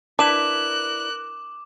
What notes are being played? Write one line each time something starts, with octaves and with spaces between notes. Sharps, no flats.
D4 E4 A#4 B4 D5 D6 F#6 E7